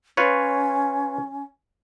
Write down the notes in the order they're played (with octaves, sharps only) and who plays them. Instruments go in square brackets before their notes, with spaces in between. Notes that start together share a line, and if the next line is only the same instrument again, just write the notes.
[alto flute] C#4 [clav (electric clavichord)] F4 B4 C#5